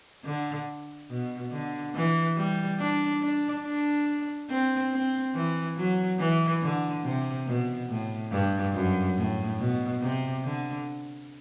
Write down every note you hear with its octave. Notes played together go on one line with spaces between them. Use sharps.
D3
B2
D3
E3
G3
D4
D4
D4
C4
C4
E3
F#3
E3
D3
C3
B2
A2
G2
F#2
A2
B2
C3
D3